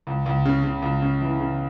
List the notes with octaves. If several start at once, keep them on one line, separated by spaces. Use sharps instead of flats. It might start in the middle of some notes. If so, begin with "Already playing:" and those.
C#2
C#2
C#3
C#3
C#2
C#3
E3
C#3